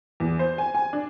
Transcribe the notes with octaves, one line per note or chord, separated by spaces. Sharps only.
E2
C5
G#5
G#5
D4